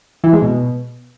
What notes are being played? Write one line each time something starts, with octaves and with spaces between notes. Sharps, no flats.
E3
G#3
B2